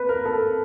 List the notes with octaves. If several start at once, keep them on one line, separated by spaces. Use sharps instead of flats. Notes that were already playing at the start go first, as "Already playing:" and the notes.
Already playing: B4
A#4
A4